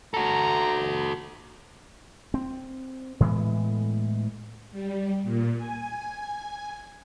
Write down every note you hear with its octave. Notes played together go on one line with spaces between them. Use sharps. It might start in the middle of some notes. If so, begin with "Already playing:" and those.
F#4 A4 A#5
C4
A2 E3 G#3 B3
G3
A#2
G#5